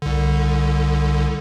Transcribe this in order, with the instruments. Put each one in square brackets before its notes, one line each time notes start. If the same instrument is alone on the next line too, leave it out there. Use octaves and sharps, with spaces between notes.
[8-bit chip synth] C2 D3